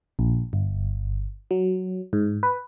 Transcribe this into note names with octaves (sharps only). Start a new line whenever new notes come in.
A#1
G1
F#3
G#2
B4